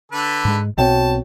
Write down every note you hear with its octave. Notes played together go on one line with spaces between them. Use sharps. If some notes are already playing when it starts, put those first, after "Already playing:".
D3 A4 B4
G#2 G#3
B1 B2 C4 F#4 C#5 G5 A5